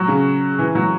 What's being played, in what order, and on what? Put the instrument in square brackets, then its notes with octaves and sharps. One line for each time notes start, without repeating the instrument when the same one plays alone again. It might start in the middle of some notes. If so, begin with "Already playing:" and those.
Already playing: [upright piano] F#3
C#3
E3
F#3